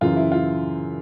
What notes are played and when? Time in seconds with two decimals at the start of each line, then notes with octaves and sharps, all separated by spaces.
0.01 F#2 C#3 E3 F4
0.17 E4
0.32 F4